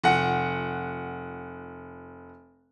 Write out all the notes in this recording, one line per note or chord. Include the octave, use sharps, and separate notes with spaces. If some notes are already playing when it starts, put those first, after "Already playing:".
F1 F#5